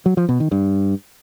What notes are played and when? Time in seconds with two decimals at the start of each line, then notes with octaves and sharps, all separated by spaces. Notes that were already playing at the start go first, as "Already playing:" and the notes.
0.06 F#3
0.17 F3
0.29 B2
0.40 D#3
0.52 G2